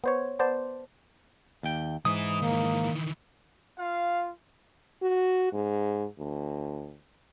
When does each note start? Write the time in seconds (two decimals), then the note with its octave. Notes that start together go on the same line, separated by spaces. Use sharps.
0.04 B3 C5 C#5
0.39 B3 C5 D5 A5
1.63 D#2 G5
2.05 G#2 E3 E4 D#6
2.42 D#3 E3 A#3
3.78 F4 F5
5.02 F#4
5.52 G#2
6.18 D2